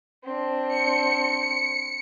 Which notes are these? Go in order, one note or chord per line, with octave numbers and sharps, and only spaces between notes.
C4 D4
C#7